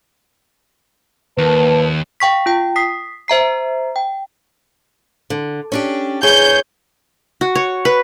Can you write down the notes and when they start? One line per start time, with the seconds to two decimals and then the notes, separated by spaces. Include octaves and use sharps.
1.38 D#2 A#3 B4 A5
2.20 F5 G5 C#6 B6
2.46 F4 G5
2.76 D#6 B6 C7
3.28 C5 E5 A#5 C7
3.96 G5
5.30 D3
5.72 C#4 D4 G4
6.23 E2 G#4 C#5 G6
7.41 F#4
7.55 C#5
7.85 B4